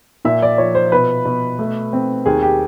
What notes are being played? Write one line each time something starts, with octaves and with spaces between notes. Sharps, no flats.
A#2 E5
D5
F3 C#5
C5
B2 B4
B2
A3
C4
D#2 G#4
G4